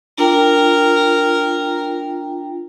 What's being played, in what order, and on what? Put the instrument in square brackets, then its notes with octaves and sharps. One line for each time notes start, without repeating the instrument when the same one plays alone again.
[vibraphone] D4 F4 G5 [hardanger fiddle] A#4